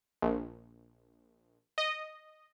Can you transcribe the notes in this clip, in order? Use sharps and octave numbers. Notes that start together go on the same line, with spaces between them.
A#1
D#5